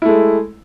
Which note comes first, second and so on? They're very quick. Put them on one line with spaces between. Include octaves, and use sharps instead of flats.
E4 A3 G#3